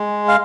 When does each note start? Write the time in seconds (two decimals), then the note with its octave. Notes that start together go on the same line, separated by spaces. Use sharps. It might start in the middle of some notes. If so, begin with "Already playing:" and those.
Already playing: G#3
0.28 F5